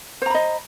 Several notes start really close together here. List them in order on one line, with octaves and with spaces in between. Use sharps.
C5 A#5 B5 D#5